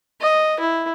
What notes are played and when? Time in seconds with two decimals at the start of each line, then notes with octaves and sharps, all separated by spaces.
0.21 D#5
0.59 E4